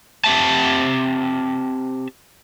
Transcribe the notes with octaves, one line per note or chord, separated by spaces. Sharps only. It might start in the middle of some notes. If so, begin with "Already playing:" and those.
C4 G4 E5 A5